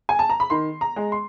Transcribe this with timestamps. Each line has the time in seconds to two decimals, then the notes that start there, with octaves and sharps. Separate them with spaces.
0.09 G#5
0.19 A5
0.29 A#5
0.40 B5
0.50 D#3 C6
0.81 A#5
0.96 G#3
1.12 C6